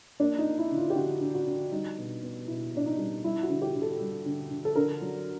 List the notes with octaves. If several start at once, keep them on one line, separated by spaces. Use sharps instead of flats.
A#3 D4
D#4
A#3
E4
D3
F4
G4
D3 F#4
D3
F#4
D3
G3 D#4
B2
B3
B2 E4
B2 D4
D#4
G3
G3 E4
F#4
D3
G4
D3
A4
G3
D3
D3
A4
D3 A#4
F#3